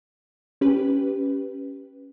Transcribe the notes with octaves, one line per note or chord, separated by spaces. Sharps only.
C#4 G4 B4